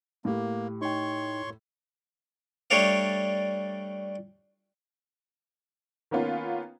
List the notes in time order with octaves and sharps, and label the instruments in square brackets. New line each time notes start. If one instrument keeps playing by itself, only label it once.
[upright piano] A2 G4 [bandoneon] A#3
[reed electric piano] D#4 G5 [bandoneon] C#5 C6 C#6
[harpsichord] G3 A3 D4 C#5 D5 F5
[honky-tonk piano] D#3 A#3 B3 C#4 F4